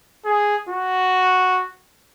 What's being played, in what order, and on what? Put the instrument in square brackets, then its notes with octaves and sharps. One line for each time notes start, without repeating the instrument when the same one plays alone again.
[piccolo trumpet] G#4
F#4